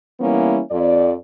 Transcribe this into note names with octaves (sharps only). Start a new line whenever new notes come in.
E3 G3 A#3 B3 C#4 E4
F2 D5